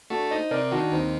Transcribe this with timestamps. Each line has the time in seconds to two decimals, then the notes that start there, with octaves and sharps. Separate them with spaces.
0.10 A3 D4 F#4
0.30 D#4 C5 D#5
0.51 C3 A#4 D5
0.71 D#3 D4 F#4
0.92 D#2 C4 D#4